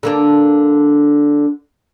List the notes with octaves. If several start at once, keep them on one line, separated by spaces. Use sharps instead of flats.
D3 A#3 D4